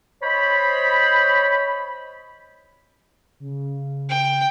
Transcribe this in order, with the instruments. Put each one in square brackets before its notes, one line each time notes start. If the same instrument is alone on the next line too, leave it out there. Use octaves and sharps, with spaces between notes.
[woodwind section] C5 C#5 D#5 B5
[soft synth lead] C#3
[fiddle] G5